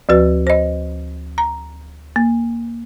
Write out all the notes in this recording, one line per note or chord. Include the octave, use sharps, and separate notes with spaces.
D2 F3 F#4 B4
C5 D#5
A#5
A#3